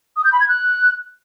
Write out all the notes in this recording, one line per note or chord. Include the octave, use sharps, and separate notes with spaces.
D#6
G6
B5
G#6
F#6